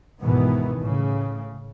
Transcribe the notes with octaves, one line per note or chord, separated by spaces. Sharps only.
C#2 G#2 B2 D#3 E3 B3
A2 C#3